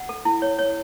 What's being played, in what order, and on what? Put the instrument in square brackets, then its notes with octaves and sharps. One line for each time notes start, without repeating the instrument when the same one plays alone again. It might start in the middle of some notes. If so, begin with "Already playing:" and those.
Already playing: [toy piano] F#5
A4
E4
C#5
C#5